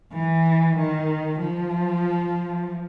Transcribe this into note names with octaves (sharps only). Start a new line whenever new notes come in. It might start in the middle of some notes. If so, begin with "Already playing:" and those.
E3
D#3
F3